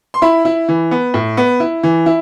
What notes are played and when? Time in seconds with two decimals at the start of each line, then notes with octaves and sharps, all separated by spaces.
0.14 C6
0.22 E4 B5
0.45 E4
0.68 E3
0.91 B3
1.14 A2
1.37 B3
1.60 E4
1.83 E3
2.06 E4